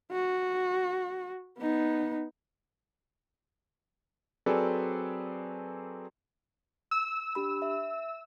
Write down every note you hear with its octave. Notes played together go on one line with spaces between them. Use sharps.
F#4
B3 D#4
F#3 C4 G#4 A4 B4 D5
E6
D4 G4 B5
E5